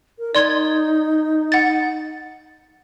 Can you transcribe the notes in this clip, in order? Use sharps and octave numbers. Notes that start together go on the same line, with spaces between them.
A#4
D#4 D5 C6 G#6
F#5 A6